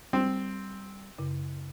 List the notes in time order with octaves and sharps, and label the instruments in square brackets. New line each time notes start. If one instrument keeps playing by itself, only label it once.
[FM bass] G3 [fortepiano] C4
[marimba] F#2 C#3